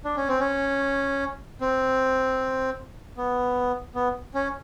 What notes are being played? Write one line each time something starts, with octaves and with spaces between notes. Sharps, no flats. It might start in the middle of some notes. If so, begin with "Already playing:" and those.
D4
C#4
C4
C#4
C4
B3
B3
C#4